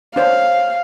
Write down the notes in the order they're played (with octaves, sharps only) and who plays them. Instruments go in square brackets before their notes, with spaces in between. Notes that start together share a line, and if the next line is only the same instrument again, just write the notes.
[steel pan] D4 C5 C#5 [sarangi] F5